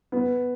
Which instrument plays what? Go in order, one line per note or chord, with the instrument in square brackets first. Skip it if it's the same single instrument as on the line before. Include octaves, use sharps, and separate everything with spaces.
[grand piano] B3